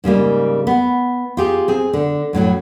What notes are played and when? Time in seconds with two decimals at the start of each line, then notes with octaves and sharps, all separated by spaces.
0.04 G#2 C#3 G3 A#3
0.67 B3
1.37 F4 G4 G#4
1.68 C4 G#4
1.93 D3
2.33 F#2 A2 D3 F#3